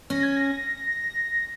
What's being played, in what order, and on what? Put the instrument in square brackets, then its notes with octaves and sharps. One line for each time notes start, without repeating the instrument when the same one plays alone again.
[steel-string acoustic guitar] C#4 [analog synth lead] A#6
[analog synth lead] G#6
A#6